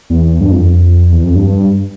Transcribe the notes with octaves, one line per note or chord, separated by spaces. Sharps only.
E2
G2
F2
E2
F2
G2